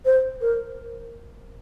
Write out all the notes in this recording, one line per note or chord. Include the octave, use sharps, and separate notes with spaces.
C5
A#4